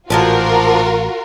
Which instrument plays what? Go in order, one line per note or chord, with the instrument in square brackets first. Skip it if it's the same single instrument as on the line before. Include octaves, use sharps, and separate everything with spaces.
[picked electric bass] A1 [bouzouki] A#2 F3 D4 [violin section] F4 F#4 A#4